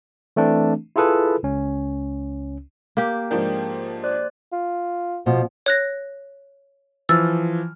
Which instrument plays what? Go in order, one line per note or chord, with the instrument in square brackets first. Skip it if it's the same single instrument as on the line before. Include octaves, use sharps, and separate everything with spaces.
[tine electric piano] E3 A3 C4 D4
E4 F4 G#4 A4 B4
C#2 C#4
[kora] A#3 G4
[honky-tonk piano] G#2 F3 D4 [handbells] A#4 G5 G6
[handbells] C5 D5 F#6
[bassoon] F4
[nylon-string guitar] B2 [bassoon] F3
[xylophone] C#5 F#6 A#6
[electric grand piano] E3 F3 F6 [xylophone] E6 A6